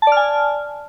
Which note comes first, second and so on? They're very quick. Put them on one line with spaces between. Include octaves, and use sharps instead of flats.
A5 D5 F6 G#5